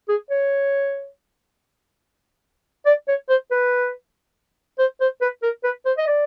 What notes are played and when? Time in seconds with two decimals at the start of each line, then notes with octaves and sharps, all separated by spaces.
0.09 G#4
0.30 C#5
2.86 D5
3.08 C#5
3.29 C5
3.51 B4
4.79 C5
5.01 C5
5.21 B4
5.43 A#4
5.64 B4
5.86 C5
5.98 D#5
6.07 D5